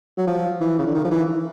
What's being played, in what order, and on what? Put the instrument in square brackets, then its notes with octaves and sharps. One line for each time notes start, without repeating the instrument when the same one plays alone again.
[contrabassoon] F#3
F3
E3
C#3
D3
D#3
F3
E3